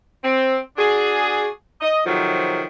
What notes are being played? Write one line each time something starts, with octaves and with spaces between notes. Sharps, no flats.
C4
D4 F#4 G#4
D#5
F2 C3 D#3 F3 F#3